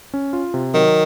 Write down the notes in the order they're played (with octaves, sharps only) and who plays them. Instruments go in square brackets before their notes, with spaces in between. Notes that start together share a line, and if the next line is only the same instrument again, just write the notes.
[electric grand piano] C#4
F4
C3
[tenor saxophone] D#3 [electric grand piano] F#3